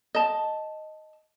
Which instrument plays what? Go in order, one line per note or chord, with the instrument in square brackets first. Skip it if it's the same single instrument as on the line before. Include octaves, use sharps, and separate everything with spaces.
[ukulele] D#5 A5